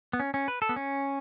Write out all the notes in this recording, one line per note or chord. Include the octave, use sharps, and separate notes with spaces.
B3
C#4
C#4
B4
A4
B3
C#4